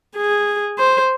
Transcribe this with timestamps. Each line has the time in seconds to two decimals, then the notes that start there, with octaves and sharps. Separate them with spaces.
0.16 G#4
0.78 C5